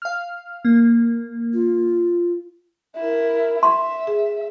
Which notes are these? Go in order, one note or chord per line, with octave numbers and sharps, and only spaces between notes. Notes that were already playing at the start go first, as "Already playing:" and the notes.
F5 F6
A#3
F4
E4 A#4
E5 C6
G#4